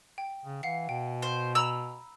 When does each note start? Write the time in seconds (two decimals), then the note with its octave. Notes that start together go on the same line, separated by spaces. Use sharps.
0.18 G5
0.45 C#3
0.63 E3 F5 F#5 C7
0.89 B2 G5
1.22 C5
1.55 A#5 B5 E6 F7